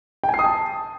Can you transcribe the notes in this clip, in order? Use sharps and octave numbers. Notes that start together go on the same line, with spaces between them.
G5
G#5
C7
D#6
A5